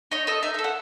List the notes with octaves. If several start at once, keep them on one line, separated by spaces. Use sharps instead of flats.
D#4 C#5
A4 D#5
D#4 E5
E5
A4
F#5